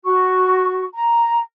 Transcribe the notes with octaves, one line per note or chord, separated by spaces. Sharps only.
F#4 C#6
A#5